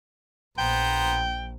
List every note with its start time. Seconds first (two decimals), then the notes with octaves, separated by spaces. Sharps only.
0.58 A#1 B3 C5 G5 A#5